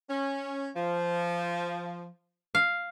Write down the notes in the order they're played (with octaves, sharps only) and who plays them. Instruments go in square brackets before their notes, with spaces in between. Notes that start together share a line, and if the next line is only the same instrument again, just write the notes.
[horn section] C#4
F3
[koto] F5